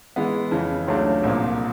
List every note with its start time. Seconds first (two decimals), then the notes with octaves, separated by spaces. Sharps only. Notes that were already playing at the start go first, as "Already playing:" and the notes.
0.16 E3 G#3 B3
0.51 F2 C#3 E3
0.87 C#2 C#3 F#3 A3 D4
1.23 C2 A#2 F3 A#3